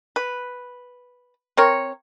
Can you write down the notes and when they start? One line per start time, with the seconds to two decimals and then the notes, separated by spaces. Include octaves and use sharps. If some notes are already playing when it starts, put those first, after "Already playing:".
0.16 B4
1.57 C4 A#4 C#5